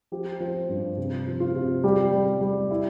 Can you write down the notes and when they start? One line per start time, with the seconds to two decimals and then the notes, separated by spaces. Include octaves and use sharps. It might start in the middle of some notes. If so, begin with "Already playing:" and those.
0.12 F3 G4
0.40 F3
0.69 G2
0.98 C3
1.27 F3
1.40 F4
1.55 C3
1.84 G3 G4
2.12 G3
2.41 G3
2.71 E4